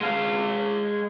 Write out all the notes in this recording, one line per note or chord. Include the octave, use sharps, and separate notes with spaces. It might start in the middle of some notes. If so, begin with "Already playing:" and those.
G#3 F5